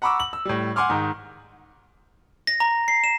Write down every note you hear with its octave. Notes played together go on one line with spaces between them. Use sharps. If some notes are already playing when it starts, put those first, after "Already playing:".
F#5 A#5 B5 C#6 D6 E6
F#7
E6
A2 G3
F#5 G#5 C6 D6 F6
G#2 D#3
A#6
A#5
C7
E7